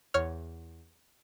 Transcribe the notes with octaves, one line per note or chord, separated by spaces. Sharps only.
E2 C#5 F6